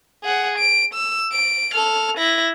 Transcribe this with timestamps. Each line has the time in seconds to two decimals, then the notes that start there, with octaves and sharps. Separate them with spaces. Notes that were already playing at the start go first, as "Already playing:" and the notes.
0.24 G#4 F#5
0.58 D7
0.94 E6
1.32 D7
1.74 A4 F6
2.18 E4 A#6